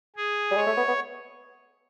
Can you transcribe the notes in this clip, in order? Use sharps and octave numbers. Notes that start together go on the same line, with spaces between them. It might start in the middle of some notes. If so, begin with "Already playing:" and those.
G#4
G3
G#3 C#5
A3
B3
B3